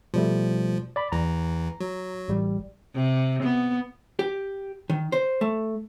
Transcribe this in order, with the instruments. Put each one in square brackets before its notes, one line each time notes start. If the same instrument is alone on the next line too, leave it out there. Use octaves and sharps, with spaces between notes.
[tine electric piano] B2 G3 A3 [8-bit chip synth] F3
[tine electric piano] D5 B5
[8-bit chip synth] E2 E3 [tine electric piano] A#5
[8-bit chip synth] F#3
[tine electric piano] A1 G3
[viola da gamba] C3
B3
[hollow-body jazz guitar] G4
D#3
C5
A3